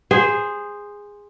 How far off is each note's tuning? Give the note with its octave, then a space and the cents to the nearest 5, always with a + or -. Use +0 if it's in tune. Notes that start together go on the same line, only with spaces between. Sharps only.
G#4 -15 C5 +0